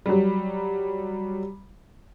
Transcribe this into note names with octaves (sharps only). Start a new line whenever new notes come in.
F#3 G3